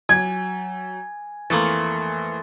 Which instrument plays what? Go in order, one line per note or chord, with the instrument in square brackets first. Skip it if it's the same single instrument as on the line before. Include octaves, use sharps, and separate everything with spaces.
[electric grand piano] F#3 [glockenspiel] G#5 [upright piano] G#6
[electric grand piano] F2 E3 [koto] A3 A#3 [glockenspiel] C6 D#6 A6